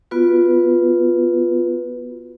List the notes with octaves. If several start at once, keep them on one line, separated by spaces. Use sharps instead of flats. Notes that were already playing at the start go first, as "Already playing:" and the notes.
B3 F4 F#4 B4